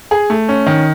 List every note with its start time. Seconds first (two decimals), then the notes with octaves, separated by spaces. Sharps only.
0.11 G#4
0.30 A3
0.49 C#4
0.67 D#3